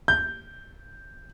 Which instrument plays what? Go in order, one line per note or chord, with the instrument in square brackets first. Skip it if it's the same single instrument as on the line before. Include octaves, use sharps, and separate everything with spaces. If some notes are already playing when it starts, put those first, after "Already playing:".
[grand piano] G6